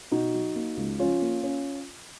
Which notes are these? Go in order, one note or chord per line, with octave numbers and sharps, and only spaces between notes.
B2 D#4 F#4
F#3
A#3
C#2
F3 C#4 F4
A#3
C#4